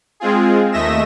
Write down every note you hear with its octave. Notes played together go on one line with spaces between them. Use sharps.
G#3 C4 F4 G#4
D#2 A3 D#5 E5 A#6 E7